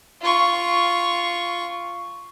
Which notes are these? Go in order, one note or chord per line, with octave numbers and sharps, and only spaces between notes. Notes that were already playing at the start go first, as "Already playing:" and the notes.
F4 C#6